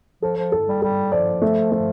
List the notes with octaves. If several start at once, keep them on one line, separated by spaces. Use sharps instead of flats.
F3 A4
F3
A4
G3
G3 A4
F3 D5
A3
A3